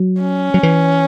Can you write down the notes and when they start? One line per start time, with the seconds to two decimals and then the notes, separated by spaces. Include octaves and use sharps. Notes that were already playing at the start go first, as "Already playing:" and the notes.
Already playing: F#3
0.21 C#4
0.54 F#3
0.63 E3